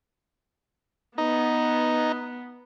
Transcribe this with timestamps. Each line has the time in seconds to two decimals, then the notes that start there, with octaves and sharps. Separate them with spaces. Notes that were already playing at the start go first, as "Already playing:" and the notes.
1.18 B3 D#4